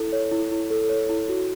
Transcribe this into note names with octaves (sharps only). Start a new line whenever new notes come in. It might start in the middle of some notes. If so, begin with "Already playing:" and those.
Already playing: E4 A4
C#5
E4
E4
A4
C#5
E4
F#4